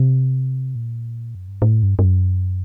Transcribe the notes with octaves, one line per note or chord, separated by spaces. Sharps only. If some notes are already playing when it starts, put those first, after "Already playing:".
Already playing: C3
A#2
F#2
G2
A2
G2
G2
F#2